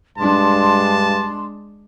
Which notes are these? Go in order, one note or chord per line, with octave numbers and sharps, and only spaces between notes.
G2 G#3 D4 A5 C6